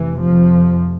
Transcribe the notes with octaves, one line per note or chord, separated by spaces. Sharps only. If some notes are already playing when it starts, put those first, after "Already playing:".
Already playing: F1 C3 E3
F2 F3